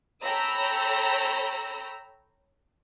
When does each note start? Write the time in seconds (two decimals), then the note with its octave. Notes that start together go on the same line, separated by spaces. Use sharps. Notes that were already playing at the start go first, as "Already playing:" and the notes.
0.23 A4 C#5 G5 A#5 B5 E6